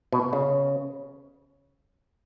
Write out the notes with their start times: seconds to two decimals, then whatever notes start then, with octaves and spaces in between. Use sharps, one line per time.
0.12 B2
0.33 C#3